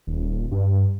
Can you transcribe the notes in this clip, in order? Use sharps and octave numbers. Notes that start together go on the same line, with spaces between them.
D#1
G2